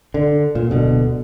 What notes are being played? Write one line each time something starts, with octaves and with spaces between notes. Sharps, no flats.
D3
A#2
D1 B2 D3